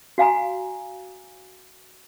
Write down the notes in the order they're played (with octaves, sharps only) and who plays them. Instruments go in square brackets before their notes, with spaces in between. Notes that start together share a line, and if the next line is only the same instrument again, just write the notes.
[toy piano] F#4 F5 G#5 A#5